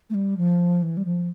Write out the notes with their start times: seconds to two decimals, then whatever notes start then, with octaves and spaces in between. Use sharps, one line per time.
0.10 A3
0.14 G3
0.37 F3
0.82 E3
0.97 G3
1.05 F3